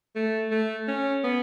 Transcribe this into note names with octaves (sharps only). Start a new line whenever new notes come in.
A3
A3
C#4
B3